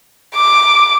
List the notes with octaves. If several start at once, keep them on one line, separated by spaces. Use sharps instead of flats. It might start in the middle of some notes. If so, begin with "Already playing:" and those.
D6